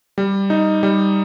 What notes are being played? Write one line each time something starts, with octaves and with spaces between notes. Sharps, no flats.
G3
D#4
G3